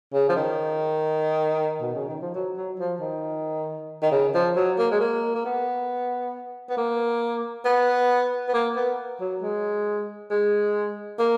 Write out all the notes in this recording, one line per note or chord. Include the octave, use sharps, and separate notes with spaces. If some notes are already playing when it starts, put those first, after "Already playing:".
C#3
F3
D#3
B2
C#3
D#3
F3
F#3
F#3
F3
D#3
D#3
C#3
F3
F#3
A#3
G#3
A#3
A#3
B3
B3
A#3
B3
B3
A#3
B3
F#3
G#3
G#3
A#3